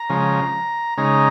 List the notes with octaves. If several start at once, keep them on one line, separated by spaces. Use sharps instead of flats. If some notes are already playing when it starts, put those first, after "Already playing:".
Already playing: A#5
C#3 F3 G#3
C#3 G#3 D#4 A#5